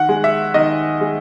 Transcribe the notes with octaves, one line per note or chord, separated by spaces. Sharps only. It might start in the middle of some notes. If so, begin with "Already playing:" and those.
Already playing: D#3 F#5
G#3
E5
D#3 D#5
G#3